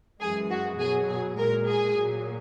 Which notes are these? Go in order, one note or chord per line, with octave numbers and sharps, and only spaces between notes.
F#2 E3 G#3 G#4
F#4
B2 F#3 G#4
G#4
A#2 G#3 A#4
G#4
A#2 F#3